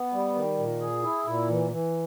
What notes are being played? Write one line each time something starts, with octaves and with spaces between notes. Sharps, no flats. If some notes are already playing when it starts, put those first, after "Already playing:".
Already playing: B3
G3
D#3
A#2
G#4
E4
A#2
E3
E3